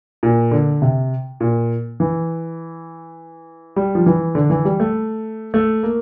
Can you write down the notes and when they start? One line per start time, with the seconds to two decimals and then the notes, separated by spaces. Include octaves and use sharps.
0.23 A#2
0.51 D3
0.82 C3
1.40 A#2
2.00 E3
3.76 G3
3.95 F3
4.06 E3
4.35 D3
4.50 E3
4.65 G3
4.80 A3
5.54 A3
5.83 A#3